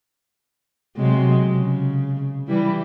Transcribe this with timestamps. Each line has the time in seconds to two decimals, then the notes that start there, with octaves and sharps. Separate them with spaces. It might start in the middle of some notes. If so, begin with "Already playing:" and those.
0.96 C3 F#3 G#3
1.54 C#3
2.48 E3 G3 E4